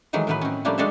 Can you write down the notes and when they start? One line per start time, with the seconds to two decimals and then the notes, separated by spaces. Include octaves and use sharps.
0.13 D#3 E3 F#3 G#3 A3
0.27 A2 D#3 E3 F#3 B3 B4
0.41 C4 C#4
0.65 F3 G3 A3 A#3 C#4 D4
0.78 G#3 D4 F#4 A4 C#5 E5